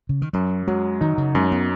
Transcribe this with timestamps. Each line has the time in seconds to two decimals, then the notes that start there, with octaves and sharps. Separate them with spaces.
0.09 C#3
0.22 D#3
0.33 F#2 F#3
0.67 F#3 G#3
1.01 D#3 D#4
1.18 C#3
1.35 F#2 G#3
1.52 B3